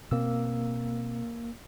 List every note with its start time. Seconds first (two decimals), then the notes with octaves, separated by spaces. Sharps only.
0.11 B2 A#3 C4 E6